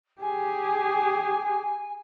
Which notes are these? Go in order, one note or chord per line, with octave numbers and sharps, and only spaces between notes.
G4 G#4 G#5